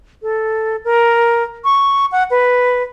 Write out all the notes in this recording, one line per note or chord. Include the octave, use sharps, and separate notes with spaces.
A4
A#4
C#6
F#5
B4